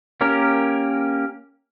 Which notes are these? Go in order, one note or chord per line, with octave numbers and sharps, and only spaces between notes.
A#3 C#4 G4 A#4